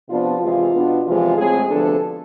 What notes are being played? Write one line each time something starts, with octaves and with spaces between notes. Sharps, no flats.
C3 F3 B3 D4 F4
E2 C3 G#3 F4
B2 B3 D4
E2 C3 F3 G#3 F4
A2 G#3 C4 G#4
D2 C3 F3 B3 D4 A4